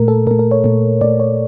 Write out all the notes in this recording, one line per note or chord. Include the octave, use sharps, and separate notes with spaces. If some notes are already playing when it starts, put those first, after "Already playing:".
Already playing: A#2 A3 A#4
A4
A#2 A3 A#4
A#4
C#5
A#2 A3
A#2 A3 D5
C#5